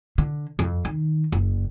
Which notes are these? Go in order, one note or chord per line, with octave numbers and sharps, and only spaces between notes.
D3
F2
D#3
F#1